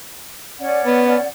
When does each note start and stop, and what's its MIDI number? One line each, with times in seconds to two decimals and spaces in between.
0.59 1.26 61
0.59 1.26 74
0.59 1.26 78
0.85 1.16 59